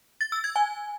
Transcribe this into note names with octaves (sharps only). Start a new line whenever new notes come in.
A6
E6
G#6
G#5